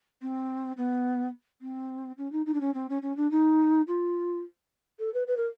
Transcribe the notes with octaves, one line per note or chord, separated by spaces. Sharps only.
C4
B3
C4
C#4
D#4
D#4
D4
C#4
C4
C#4
C#4
D4
D#4
F4
A4
B4
B4
A#4